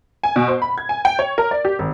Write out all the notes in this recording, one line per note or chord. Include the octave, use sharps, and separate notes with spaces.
G#5
B2
C5
B5
G#6
G#5
G5
C#5
A#4
D5
G4
G#1